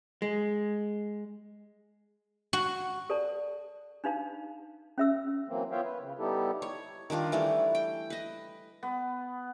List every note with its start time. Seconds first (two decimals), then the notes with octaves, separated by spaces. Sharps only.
0.22 G#3
2.53 F#4
3.10 A4 D5 A5
4.04 D4 D#4 F5 A5
4.98 C#4 E5 E6
5.48 E3 F#3 A#3 C4
5.71 B3 F4 C#5 E5 F5 G5
5.83 B4
5.99 C#3
6.19 G3 B3 D#4 E4 G4 A4
6.62 C#5
7.10 D#3 G3 D4 F4
7.32 E3 G3 A3 A4
7.75 G5
8.10 B4 D#5
8.83 B3